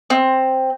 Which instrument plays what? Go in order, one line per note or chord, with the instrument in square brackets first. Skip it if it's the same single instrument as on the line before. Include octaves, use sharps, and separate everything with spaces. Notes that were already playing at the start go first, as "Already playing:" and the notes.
[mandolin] C4